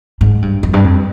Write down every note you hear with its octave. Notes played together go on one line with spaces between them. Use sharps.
G#2
G2
F2
G2
F2